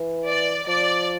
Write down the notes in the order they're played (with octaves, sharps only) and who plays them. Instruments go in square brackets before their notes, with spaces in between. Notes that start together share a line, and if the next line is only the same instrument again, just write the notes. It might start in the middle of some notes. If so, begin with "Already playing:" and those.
Already playing: [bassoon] E3
[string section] D5
[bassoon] F3 [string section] D5